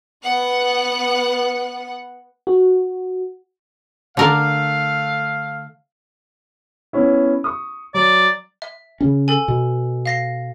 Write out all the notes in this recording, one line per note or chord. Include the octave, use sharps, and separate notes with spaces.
B3 F#5
F#4
D3 A3 A#4 D5 F5
B3 C#4 E4
C#6 D#6
F#3 D5
E5
C#3 C#4
A4 G#5
B2
F5 A#6 C7